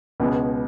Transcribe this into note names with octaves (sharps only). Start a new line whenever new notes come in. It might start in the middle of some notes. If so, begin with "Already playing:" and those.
C#2 B2 G#3 B3